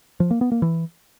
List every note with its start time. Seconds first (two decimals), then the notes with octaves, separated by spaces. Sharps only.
0.20 F3
0.31 A#3
0.41 B3
0.52 A#3
0.62 E3